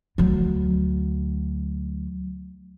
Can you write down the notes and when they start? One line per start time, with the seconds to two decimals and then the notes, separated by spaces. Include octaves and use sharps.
0.18 D2 F#3